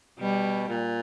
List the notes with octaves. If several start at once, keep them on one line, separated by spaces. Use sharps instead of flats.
B2 G3
A#2